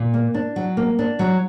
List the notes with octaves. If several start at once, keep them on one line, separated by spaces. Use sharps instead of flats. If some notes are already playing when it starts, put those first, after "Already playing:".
Already playing: A#2
A#3
D4
F#3
A#3
D4
F#3